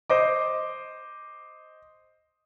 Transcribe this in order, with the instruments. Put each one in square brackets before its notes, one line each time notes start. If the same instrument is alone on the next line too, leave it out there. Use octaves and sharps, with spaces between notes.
[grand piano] C5 D#5 D6